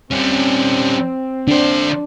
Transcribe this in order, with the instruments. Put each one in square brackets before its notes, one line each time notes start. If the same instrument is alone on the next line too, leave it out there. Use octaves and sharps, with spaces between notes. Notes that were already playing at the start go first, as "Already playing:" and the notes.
[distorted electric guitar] G3 C#4 [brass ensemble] C4
[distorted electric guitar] D3 C5 [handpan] D4